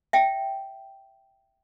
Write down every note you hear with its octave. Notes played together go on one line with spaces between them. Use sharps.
E5 G5